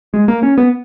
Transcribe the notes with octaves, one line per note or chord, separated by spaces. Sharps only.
G#3
A#3
C#4
B3